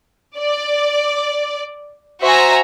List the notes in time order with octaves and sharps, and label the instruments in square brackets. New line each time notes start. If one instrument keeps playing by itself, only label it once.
[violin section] D5
F#4 C5 E5 G#5 A#5